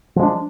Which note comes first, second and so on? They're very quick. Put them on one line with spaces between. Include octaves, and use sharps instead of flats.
F3 G#3 D4